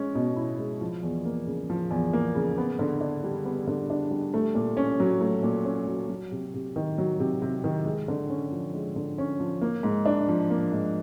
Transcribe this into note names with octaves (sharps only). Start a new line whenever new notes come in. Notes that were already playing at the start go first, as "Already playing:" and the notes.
Already playing: G#3 C#4
B2
E4
G#3
F3
E2
A#3
C#3
F3
E2
A#3
C#3
B3
D3
D4
G3
B3
D3
D4
G3
A3
A#2
C#4
F#3
A3
A#2
C#4
F#3
F#3
C3
C3
D#3
F#3
C3
C3
D#3
G#3
D3
C#4
F3
G#3
D3
C#4
F3
A#3
G#2
D4
F3
A#3
G#2